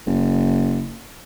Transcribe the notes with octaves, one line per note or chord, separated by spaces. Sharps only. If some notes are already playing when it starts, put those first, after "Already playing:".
F#1